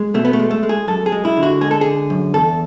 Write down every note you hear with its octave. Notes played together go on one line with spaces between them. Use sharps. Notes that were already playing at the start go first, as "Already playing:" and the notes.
Already playing: G#3
B2 A3
B3
A3
G#3
A3
G#3
G#4
F#2 A4
G#4
G#3
E4
D3
F#4
G#3 G#4
A4
D3 G#4
F#2
E2 A4